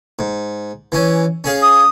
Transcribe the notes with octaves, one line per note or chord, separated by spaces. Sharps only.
G#2
E3 C#4
C#4 G#4 F5
D#6